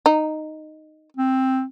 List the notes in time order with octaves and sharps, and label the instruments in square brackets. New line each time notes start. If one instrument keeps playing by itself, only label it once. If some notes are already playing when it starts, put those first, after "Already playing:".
[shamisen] D#4
[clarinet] C4